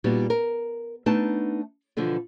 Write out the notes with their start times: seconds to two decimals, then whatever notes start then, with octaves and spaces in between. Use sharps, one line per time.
0.04 A#2 G3 B3 D#4 F#4
0.30 A#4
1.06 A3 B3 D4 D#4 A5
1.97 B2 D3 E3 F3 B3